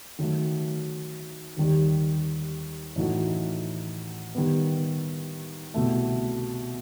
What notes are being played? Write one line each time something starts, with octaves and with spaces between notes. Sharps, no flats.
D#3 F#3 A3
D#2 D#3 G3
A2 E3 A3 D#4 F#4
D#3 G3 B3
C2 B2 A3